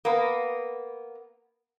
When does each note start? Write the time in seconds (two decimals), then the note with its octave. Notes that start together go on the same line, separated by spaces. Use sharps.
0.05 A#3 B3